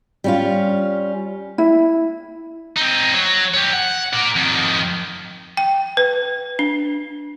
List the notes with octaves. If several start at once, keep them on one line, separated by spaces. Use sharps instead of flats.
G3 C#4 F4
E4
C4 D#4
F#3
G4 C#5
F#5
A#4 D5
F2 D#3
G5
B4
D4